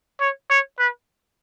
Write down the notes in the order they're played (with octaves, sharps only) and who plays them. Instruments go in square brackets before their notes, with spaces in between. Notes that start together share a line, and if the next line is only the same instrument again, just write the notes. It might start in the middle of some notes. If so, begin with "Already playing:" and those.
[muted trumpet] C#5
C#5
B4